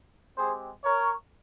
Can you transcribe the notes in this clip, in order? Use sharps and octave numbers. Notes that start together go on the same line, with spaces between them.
G#3 C4 G4 G#4 C5
A#4 C#5